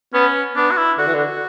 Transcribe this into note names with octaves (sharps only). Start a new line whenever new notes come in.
B3 C#4
B3 D4
F#4
E4
D3 F#4
E3
D3
F#4